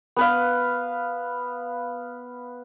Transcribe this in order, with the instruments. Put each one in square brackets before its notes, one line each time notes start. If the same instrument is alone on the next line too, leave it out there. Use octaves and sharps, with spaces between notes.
[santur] B3 B4 F5